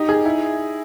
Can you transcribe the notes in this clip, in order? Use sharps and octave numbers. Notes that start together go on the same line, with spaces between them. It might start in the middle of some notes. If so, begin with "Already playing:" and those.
Already playing: D#4 G4
G#4
E4